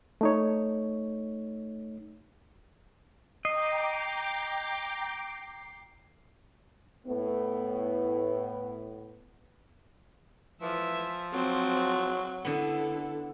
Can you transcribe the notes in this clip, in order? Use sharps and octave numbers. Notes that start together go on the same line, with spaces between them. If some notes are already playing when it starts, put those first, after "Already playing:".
A3 D#4 C#5
D#5 G5 A#5 D6 C7
A2 B3
E3 F3 E5
F#3 C4
D3 B3 E4 A4